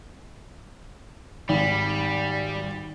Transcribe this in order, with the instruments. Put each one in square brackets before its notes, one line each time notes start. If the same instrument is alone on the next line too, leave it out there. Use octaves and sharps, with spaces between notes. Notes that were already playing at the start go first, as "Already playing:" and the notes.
[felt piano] G#1 [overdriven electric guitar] G3